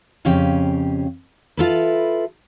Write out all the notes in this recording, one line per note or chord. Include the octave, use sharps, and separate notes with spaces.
F2 C#3 C#4 G4 F5
E4 F4 A4 B4